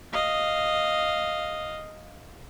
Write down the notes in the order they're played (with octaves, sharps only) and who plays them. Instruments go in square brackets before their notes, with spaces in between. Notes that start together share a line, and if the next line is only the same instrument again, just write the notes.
[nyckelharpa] D#5 F5